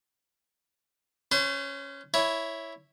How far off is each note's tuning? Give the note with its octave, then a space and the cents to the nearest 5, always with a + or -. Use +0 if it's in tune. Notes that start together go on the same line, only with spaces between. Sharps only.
C#4 +0 C5 -45 C6 +0
E4 +0 C#5 +0